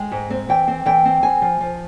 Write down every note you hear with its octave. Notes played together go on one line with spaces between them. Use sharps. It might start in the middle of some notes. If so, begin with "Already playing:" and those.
Already playing: G#3 G5
G#2
C4
E3 G5
C4
E3 G5
C4
F2 G#5
F3
F3